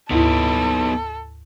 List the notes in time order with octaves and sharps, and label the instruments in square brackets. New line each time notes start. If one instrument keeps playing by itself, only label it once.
[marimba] D2 G#2 E4 [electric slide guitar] B3 D#4 B4 [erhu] A4